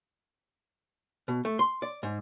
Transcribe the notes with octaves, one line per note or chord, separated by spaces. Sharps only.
B2
A3
C6
D5
G#2